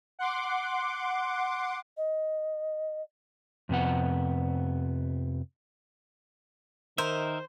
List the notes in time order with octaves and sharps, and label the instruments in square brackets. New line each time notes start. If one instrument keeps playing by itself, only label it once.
[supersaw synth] F#5 C6 D6
[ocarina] D#5
[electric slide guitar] F2 C3 B3 F#5
[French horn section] D#3 [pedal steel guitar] D#4 A#4 E5 [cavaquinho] C5